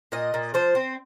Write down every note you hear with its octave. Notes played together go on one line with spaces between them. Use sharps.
A#2 D#5
A#2
F3 C5
C4